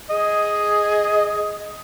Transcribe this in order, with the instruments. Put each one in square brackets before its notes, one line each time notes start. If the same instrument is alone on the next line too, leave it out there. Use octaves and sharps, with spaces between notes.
[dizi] G#4 [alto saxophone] D#5